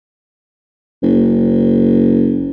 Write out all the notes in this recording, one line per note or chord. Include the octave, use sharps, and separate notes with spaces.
F#1